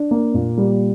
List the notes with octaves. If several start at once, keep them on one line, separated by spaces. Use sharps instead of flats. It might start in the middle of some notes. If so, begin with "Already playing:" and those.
Already playing: D4
A#3
A#2
G3